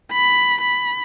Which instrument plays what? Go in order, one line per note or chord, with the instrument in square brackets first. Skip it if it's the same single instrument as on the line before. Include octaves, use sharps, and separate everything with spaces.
[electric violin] B5
B5